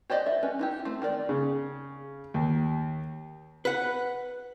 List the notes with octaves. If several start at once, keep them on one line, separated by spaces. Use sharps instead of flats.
G4 C5 D5 D#5
E5
C#4 B4
D#4 E4 G4
A3 C4
D#3 A#4 D5
C#3
D#2
B4 F#5